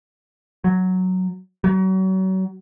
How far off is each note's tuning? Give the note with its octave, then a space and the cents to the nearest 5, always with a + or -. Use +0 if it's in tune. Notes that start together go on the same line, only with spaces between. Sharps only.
F#3 +0
F#3 +35